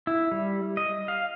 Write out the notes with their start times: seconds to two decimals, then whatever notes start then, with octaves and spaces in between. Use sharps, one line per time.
0.07 E4
0.32 G3
0.77 D#5
1.08 F5